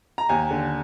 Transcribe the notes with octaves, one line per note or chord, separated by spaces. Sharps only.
A#5
D#2 G#5
D3